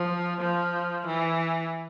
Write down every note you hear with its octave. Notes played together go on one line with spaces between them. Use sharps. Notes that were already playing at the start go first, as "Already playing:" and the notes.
Already playing: F3
F3
E3